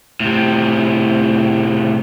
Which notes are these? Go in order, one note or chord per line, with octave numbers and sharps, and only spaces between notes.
A2 C3